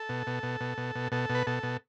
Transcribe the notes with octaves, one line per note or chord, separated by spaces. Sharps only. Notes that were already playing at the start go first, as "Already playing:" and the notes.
Already playing: A4
B2
B2
B2
B2
B2
B2
B2 A4
B2
B4
B2 A4
B2